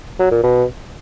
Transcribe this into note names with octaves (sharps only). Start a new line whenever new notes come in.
F#3
A#2
B2